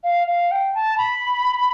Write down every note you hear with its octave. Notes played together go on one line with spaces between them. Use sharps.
F5
F5
G5
A5
B5